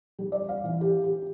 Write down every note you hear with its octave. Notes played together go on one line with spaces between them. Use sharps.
G3
D5
F5
E3
G4
G4